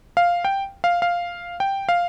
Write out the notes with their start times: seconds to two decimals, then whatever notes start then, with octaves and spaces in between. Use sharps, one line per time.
0.17 F5
0.45 G5
0.84 F5
1.02 F5
1.60 G5
1.89 F5